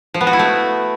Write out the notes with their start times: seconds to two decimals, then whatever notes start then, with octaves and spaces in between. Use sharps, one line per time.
0.14 F3
0.21 B3
0.27 F#4
0.33 E4
0.39 A3